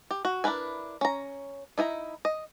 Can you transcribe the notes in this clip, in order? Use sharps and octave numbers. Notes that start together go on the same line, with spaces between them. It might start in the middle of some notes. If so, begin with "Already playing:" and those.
G4
F#4
D4 E4 A#4 B4 G#5
C#4 A#5
D#4 E4 G#5 A#5
D#5